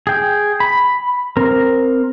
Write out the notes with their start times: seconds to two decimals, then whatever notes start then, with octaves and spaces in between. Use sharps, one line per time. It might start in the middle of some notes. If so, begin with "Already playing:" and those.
0.07 G#4 G5
0.60 B5
1.37 C4 A#4